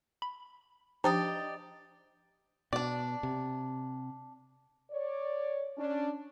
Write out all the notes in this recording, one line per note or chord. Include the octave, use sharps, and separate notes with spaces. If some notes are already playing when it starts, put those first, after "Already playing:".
B5
F3 D4 D#4 G4 D5 D#5
B2 D4 D5
C3
C#5 D5
C#4 D4